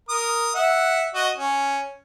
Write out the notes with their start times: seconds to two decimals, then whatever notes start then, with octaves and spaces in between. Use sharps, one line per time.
0.09 A#4 D#6
0.55 E5 F#5
1.15 F#4 D#5
1.37 C#4